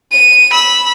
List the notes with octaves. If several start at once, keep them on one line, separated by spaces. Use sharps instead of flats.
D#7
B5 E6